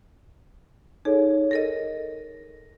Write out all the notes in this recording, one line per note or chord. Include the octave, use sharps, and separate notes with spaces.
D#4 G#4 A4 C#5
A4 A#4 D#5 A#6